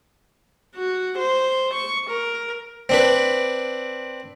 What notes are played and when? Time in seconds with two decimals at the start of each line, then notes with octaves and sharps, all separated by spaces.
0.75 F#4
1.18 C5
1.74 C#6
2.10 A#4
2.89 C4 D4 B4